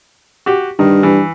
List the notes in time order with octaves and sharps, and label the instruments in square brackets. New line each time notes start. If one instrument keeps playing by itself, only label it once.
[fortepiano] F#4 G4
[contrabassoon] G2 [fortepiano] D#3
[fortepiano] E3